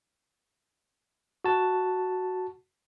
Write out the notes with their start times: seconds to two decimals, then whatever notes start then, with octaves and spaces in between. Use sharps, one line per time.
1.45 F#4 A5